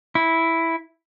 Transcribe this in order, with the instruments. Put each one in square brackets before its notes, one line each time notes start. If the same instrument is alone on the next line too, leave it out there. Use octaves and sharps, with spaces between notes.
[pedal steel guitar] E4